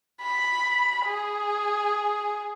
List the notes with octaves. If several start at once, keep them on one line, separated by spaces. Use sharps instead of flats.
B5
G#4